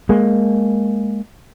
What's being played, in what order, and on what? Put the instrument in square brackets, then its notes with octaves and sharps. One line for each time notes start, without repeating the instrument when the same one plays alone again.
[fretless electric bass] G#3 A#3